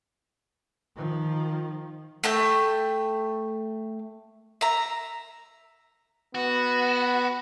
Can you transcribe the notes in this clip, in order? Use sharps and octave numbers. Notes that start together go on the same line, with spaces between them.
D#3 F3
A3 E5 G5
E5 A#5
B3 F#4